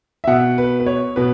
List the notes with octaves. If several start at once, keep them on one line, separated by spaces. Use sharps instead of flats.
E5
B2 F#5
B4
B4
C#5
B2 B4